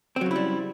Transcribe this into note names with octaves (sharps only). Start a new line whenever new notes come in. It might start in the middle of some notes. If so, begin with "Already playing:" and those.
C#3 F#3 G3 C4 E4